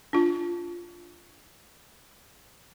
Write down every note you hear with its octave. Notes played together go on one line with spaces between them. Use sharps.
D4 F4